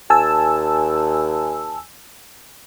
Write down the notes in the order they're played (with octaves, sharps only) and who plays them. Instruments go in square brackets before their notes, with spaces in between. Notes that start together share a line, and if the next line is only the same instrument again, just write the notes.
[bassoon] D#2 [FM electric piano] G#5 A5 E6